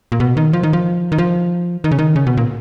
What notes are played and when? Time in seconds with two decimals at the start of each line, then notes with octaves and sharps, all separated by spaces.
0.12 A#2
0.20 B2
0.37 D#3
0.53 F3
0.63 D#3
0.73 F3
1.12 D#3
1.18 F3
1.84 D#3
1.91 C#3
1.99 D#3
2.16 C#3
2.27 B2
2.37 A#2